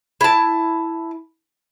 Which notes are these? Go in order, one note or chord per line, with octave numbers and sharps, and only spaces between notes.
E4 A5